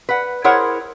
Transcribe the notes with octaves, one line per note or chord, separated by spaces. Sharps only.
B4 F#5
E4 G#4 A#4 C5 C#5 F#5